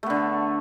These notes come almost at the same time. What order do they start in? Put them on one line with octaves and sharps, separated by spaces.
A3 B3 D3